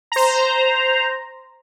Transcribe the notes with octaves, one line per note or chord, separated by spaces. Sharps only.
C5 A#5